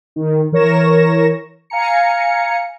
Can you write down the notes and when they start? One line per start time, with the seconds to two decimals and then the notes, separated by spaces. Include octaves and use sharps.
0.16 D#3
0.52 E3 A#4 C#5 C#6 A#6 E7
1.70 F5 G#5 A#5 C#7